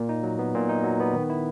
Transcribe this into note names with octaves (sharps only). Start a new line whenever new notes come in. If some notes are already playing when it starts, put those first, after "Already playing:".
Already playing: A#2 A#3
D#4
F#3
B3
A#2
D#4
F#3
B3
D#3
E4